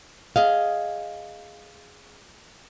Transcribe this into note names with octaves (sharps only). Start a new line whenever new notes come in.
G#4 D#5 F5